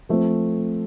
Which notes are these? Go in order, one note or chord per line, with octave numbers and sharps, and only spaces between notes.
F3 A3 C4